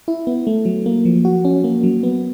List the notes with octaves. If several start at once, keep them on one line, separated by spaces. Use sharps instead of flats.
E4
B3
A3
F#3
A#3
F3
F#4
C#4
A#3
F#3
B3